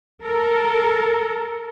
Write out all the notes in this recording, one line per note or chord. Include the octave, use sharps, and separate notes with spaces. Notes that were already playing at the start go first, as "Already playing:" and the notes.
A4 A#4